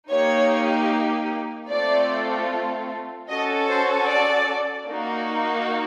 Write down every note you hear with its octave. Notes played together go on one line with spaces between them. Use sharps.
A#3 D#4 G4 C#5
A3 C4 F4 A4 D5
C#4 F#4 A4 D#5
C5
D5
A#3 D#4 F#4